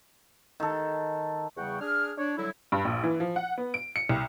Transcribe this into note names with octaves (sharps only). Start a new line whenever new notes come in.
D#3 A4
E2 C#3 G3 F#5 G5 C#6
D4 G#4 F6
D4 C#5
D3 F#3 G3 E4
G2
A#1
E3
F3
F#5
B3
D7
C#7
C2